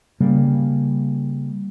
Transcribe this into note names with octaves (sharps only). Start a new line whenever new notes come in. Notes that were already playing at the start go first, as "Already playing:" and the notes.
C#3 G3 A#3